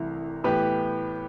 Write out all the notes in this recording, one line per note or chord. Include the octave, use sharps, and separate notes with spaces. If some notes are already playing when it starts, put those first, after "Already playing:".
Already playing: C2 C3 E3 A3
A2 E3 B3 G4 B4